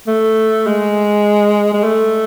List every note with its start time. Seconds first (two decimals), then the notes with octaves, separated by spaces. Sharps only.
0.07 A3
0.67 G#3
1.73 G#3
1.84 A3